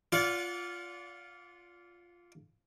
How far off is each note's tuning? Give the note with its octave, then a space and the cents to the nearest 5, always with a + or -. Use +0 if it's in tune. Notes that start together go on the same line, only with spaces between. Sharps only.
F4 +0 D5 -30 F#5 -30